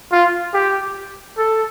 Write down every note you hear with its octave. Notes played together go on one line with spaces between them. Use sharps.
F4
G4
A4